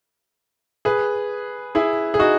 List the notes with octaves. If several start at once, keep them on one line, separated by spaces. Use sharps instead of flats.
G#4 B4
E4 G#4
G#4
D#4 F#4